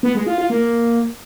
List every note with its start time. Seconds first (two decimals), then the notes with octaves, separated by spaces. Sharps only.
0.03 B3
0.15 G#3
0.26 F4
0.38 F4
0.50 A#3